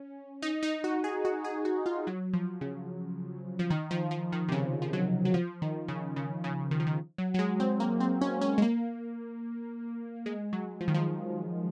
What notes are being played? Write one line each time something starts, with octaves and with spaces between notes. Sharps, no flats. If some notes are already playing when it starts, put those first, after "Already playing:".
Already playing: C#4
D#4
D#4
F#4
G#4
F#4
G#4
F#4
F4
F#3
F3
C#3
F3
D#3
F3
F3
D#3
C3
C#3
F3
F#3
F#3
F3
D#3
C#3
C#3
C#3
D#3
F3
D#3
F#3
F#3
G#3
C4
A#3
C4
C#4
C#4
G#3
A#3
G#3
F#3
F3
D#3
F3